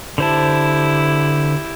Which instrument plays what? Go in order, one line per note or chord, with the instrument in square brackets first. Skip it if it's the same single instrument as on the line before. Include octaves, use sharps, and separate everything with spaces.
[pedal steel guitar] D3 C5 A5 [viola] E4 G4